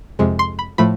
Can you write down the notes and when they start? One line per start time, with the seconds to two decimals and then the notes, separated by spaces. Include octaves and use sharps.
0.19 F2 C3 G#3
0.39 C6
0.59 B5
0.78 A2 F3 A3 B5